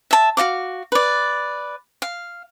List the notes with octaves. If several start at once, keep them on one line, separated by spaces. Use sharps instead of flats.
E5 A5
F#4 D#5 F5 D6
B4 D5
F5